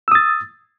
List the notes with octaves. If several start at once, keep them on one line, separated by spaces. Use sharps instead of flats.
D#6 E6 A6